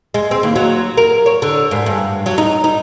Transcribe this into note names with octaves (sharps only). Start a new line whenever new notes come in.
G#3
C4
D#2
F#3
A#4
C#5
D3
G#2
G2
F#3
D#4
D#4